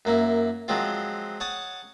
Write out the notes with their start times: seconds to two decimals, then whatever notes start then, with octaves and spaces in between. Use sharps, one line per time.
0.05 F#2 A#3 E4
0.68 F3 F#3 G#3 C4 F4
1.40 C#5 F#5 A5 D#6